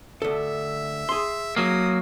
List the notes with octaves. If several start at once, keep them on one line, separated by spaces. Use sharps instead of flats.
D2 A4 E5
G#4 C6
F#3 A#3 D#6